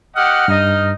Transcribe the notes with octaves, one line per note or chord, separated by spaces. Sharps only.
G4 D#5 F#5 F6
G2 D#4 D#5